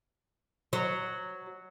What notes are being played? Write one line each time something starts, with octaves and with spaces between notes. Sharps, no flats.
F#3